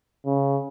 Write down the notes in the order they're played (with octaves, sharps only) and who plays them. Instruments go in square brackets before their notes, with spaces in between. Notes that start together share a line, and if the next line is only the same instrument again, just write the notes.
[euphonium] C#3